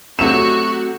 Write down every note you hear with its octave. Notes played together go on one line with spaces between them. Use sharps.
C3 F#3 A3 F#4 E7